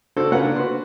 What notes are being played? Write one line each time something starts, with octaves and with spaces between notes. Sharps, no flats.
D4 F#4 A4 C5
A#3 C#4 F4 A#4 B4 F#5
D4
F#4 B4 C6